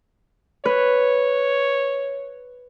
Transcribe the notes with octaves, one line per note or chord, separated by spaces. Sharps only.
B4 C#5